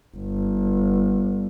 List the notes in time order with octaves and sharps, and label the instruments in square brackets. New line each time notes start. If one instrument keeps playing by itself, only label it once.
[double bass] G1